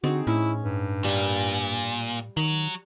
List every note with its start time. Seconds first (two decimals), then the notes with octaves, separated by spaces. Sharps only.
0.04 D3 C4 D#4 F#4 G#4
0.27 A2 C#4 E4
0.62 G2
1.04 A#2 G3
2.37 D#3 F#3